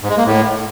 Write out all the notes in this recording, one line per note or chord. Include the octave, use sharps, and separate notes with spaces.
G#2
G#3
A#3
A2